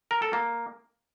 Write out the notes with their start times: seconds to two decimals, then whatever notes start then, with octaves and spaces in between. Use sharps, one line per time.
0.11 A#4
0.22 A4
0.33 A#3